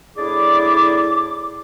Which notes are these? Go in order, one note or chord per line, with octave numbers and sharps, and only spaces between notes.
A2 D4 E4 G#4 D5 D6